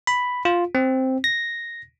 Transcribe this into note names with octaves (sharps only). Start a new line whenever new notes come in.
B5
F4
C4
A#6